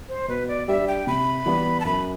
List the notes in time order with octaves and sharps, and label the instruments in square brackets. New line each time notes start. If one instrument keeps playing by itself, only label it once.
[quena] C5
[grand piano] B2 [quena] B4
[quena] D5
[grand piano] G3 D4 G4 [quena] E5
[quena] G5
[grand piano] C3 [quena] B5
[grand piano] E3 G3 B3
[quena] A5
[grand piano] F#2 [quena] B5